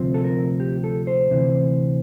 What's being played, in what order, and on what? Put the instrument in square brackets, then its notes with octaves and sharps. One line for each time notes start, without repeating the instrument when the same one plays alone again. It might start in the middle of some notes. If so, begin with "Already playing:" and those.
Already playing: [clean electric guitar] D2 C3 F3 C4
A4
A#4
G4
A4
C5
D2 C3 E3